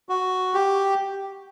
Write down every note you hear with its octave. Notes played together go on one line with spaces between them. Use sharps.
F#4
G4